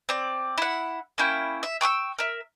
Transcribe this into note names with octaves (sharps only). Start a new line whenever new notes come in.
C4 D5
E4 F#5
A#3 C#4 E4 G5
E5
G5 C#6 D6 E6
A#4 E5